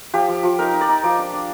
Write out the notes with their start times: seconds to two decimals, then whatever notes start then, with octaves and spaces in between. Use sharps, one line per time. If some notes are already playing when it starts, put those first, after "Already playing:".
0.14 F3 G4
0.28 F3
0.43 F3
0.59 D#4 A#4
0.74 D#4
0.81 D5
0.89 D#4
1.03 F3 D5
1.18 D4
1.33 D4